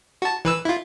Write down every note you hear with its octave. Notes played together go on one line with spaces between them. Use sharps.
F#4 A5
E3 B4 E6
E4 F4